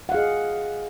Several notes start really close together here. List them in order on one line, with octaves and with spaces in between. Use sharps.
F#5 F5 G#4 D#5